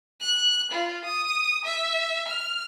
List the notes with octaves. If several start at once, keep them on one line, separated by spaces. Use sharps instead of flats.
F#6
F4
D#6
E5
F6